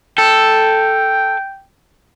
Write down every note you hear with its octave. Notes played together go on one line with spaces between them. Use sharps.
A4 G5